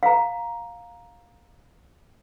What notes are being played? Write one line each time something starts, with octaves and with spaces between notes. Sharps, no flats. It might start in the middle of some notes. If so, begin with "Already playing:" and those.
F5 A#5